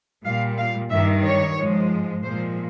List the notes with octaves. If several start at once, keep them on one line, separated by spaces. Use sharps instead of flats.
A#2 G3 F5
F5
G2 D#3 G3 E5
C#5
G#2 F3 G#3
A#2 F3 G#3 C5